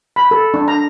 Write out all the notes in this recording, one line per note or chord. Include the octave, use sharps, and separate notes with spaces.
B5
A4
D4
A#5